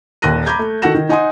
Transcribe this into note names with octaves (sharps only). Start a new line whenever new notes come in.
D#1 D#2 F#6 A#6 D#7
A#5 B5 D6 G6 G#6
A3
D#3 F#4 A4 F#5 A#6 E7
D#3
D#4 D#5 F#5 G#5 C6 D#6